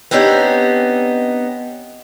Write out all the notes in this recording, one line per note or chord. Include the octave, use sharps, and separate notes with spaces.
B3 C4 D4 D#4 G4 C#5